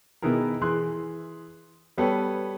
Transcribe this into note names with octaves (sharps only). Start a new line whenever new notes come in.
B2 D#3 B3 E4 G#4 A#4
E3 G#4 C6 F#6
G3 B3 G4 A4 B4 C#5